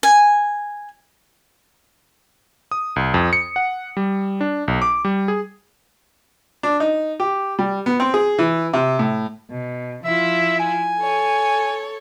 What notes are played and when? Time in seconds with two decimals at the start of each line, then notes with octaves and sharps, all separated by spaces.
0.03 G#5
2.71 D#6
2.96 C2
3.14 F2
3.33 C#7
3.56 F#5
3.97 G3
4.41 D4
4.68 B1
4.82 D6
5.05 G3
5.28 G#4
6.63 D4
6.80 D#4
7.20 G4
7.59 G3
7.86 B3
8.00 C4
8.14 G#4
8.39 E3
8.73 C3
8.99 A2
9.50 B2
10.05 F3 E4 F4 E5
10.59 G#5
10.98 A4 C#5